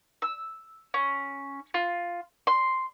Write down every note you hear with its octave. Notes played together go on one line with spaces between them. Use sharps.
E6
C#4
F4
C6